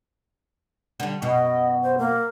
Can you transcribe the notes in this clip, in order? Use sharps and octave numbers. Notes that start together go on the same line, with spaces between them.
D3 G3
F#2 B2 D#5
C5
A#3